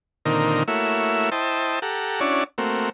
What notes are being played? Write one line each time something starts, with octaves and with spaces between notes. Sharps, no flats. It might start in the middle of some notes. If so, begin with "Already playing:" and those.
A#2 D3 D#3 C4 D#4 A#4
A3 A#3 E4 F#4 C#5 E5
E4 C5 D#5 G5 A5
G4 A4 F#5 A#5
C#4 D4 E4 F#4 C#5 D5
A3 A#3 C4 F#4